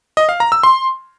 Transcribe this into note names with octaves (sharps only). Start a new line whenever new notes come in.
D#5
F5
A#5
E6
C6